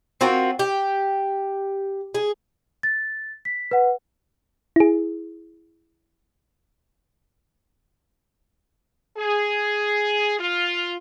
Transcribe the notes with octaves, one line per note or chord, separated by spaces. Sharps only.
C4 F4 F#4 A#4
G4
G#4
A6
B6
B4 F#5
E4 G#4
G#4
F4